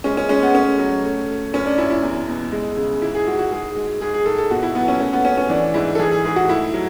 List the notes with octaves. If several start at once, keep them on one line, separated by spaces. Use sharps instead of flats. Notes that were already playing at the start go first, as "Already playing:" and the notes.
G#3 C#4
C#4
G#3 C#4
B3
A3 C#4
F#3
A3
A3
F#2 C#4
D4
F#2 E4
E4
E2
B2
G#3
C#3
G#2 E4
G#4
G#2 F#4
F#4
G#2 G#4
G#3
G#2 G#4
G#4
G#2 A4
A4
B2 F#4
E4
F#3 B3
C#4
A3 C#4
B3
A3 C#4
C#4
E3 D4
G#2 E4
A4
E3 G#4
G#4
G#2 G#4
F#4
A3 E4
F#3